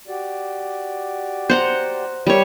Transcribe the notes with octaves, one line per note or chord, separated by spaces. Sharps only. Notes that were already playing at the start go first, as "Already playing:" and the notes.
F#4 G4 D5
C5 F#5 A#5
G3 A#4 C#5 E5 G5